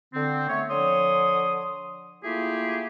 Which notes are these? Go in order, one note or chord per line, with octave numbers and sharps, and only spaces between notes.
D3 C4
A3 B3 C#5
D3 F3 C#5 C6 D#6
A3 A#3 E4 F4 G4 G#4